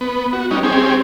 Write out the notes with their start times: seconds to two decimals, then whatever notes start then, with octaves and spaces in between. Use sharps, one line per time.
0.01 B3
0.33 F#4
0.51 G3 C#4 D#4
0.63 C4 C#4 G4 G#4